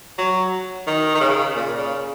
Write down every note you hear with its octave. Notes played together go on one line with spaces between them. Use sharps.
F#3
D#3
D#3
C#3
A#2
C#3